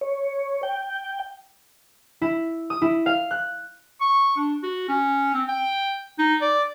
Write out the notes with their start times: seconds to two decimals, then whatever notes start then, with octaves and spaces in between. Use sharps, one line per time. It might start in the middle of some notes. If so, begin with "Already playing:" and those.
0.01 C#5
0.63 G5
2.21 E4
2.70 D#6
2.82 E4
3.06 F5
3.31 F#6
4.01 C#6
4.37 D4
4.63 F#4
4.89 C#4
5.34 C4
5.48 G5
6.19 D#4
6.41 D5